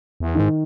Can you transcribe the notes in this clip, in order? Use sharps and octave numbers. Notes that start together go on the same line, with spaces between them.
E2
G#2 D#3